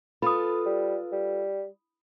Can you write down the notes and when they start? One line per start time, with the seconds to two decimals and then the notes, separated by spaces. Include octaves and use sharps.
0.22 F4 A4 B4 B5 D#6
0.66 G3
1.12 G3